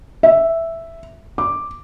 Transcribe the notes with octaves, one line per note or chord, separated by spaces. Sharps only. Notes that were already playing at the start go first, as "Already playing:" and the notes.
E5
D6